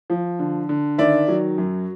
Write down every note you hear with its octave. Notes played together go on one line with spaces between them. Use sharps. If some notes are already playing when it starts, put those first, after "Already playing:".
F3
D3
D3
D#3 D5 E5
F#3
F#2